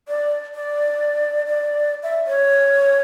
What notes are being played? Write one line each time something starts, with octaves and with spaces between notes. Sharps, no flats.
D5
D5
D5
E5
C#5